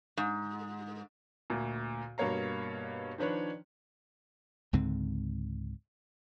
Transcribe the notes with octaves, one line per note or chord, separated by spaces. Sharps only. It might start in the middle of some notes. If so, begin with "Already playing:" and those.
G#2
D2 A#2
G2 B2 A#3 C#5 F5 A#5
D#3 F3 D4 B4 C#5
C#2 G#2 D3 C4